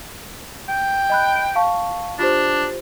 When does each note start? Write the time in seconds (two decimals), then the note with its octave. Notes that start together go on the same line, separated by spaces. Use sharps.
0.69 G5
1.10 D#5 B5 F#6
1.55 F5 A5 C#6
2.19 D4 F4 G4 C5